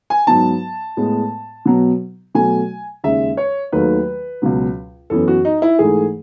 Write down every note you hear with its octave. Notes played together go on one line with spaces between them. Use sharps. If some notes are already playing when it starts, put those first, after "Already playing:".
G#5
G#2 F#3 B3 A5
A2 G#3 B3
B2 F#3 B3
B2 F#3 A3 G#5
D#2 C#3 G#3 E5
C#5
D#2 D#3 F#3 A3 B4
C#2 B2 F#3
F#2 E3 B3 A4
F#4
D#4
E4
G#2 E3 A3 G#4